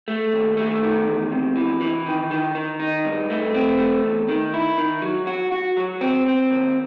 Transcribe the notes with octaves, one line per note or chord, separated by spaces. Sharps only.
A3
D#2
A3
D#3
E2
C3
E3
E3
D#3
D#3
D#3
D#4
G2
A3
C4
A3
E2
D#3
E4
D#3
F#3
F#4
F#4
F#3
C4
C4
D#2